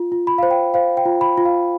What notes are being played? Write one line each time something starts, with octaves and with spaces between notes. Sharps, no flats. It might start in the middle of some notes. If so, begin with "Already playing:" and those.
Already playing: F4
F4
B5
C5 F5
G5
C5 F5
G5
F4
B5
F4
F5